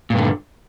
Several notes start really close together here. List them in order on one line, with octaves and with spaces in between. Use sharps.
A#2 G2 D3